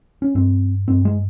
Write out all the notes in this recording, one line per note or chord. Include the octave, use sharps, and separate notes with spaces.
C#4
G2 C4
G2 C4
G#3